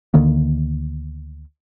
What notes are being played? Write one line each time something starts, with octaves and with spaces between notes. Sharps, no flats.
D2 D3 D#3 A#3